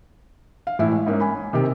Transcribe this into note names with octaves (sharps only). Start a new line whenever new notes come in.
F5
A2 E3 E4
G#3
G#2 A#3 C#4
G#5 B5
C3 D#3 A#3 G4